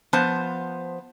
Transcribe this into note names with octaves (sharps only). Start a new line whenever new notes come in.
F3 B3 C5 A5